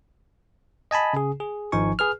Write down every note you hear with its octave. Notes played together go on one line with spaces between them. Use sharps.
D#5 G#5 A5 B5
C#3 G#4
G#4
G#1 F3 D#4 G#5 C#6
G#4 B4 F6